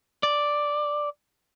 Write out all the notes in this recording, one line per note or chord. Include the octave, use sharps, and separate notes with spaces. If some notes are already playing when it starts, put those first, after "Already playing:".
D5